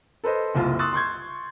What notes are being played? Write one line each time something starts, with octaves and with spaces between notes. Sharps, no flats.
A4 B4 C5 D#5
F#1 C2 F4
C6 C#6 D#6 E6 F#6 A6
C6 C#6 G6 G#6